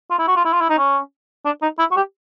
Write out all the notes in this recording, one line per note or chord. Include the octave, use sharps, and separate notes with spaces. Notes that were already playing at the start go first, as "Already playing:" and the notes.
F4
E4
F#4
F4
E4
F4
E4
D#4
C#4
D4
D#4
E4
F#4
G4